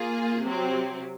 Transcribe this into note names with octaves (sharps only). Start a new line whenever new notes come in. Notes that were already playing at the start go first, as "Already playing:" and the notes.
Already playing: A#3 F4 G#4
C3 F#3 C4